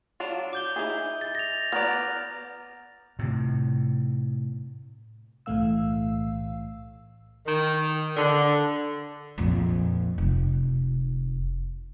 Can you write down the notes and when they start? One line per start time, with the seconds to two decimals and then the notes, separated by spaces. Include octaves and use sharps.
0.20 F#3 D4 F4
0.53 D6 G6 G7
0.76 D#4 E4 G#4
1.21 A6
1.35 A#6 F7
1.72 B3 D5 A#5 F6
3.19 A2 C3
5.46 B1 A2 E3 A3 F5 E6
7.45 D#3
8.17 D3
9.38 A#1 F2
10.18 F1